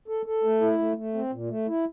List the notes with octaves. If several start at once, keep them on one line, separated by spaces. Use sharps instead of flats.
A4
A4
A3
E4
A3
A3
C4
A#2
A3
E4